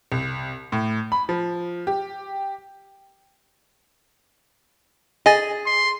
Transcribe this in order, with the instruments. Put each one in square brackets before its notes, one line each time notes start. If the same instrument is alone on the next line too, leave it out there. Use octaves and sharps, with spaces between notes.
[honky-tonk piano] C2
A2
B5
F3
G4
[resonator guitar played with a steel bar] G#4 [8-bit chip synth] D#5 G#5 A6
[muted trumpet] C6